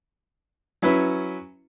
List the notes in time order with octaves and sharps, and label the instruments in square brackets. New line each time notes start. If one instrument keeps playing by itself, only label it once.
[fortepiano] F#3 C#4 E4 B4